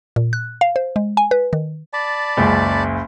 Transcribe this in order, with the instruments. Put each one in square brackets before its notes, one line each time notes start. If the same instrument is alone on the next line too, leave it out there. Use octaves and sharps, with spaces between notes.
[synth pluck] A#2
F#6
F5
C5
G#3
G#5
B4
D#3
[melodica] D5 A5 B5
[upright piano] F#1 C#2